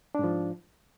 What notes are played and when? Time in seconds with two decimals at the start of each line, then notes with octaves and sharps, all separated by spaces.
0.15 D4
0.19 G#2
0.24 F3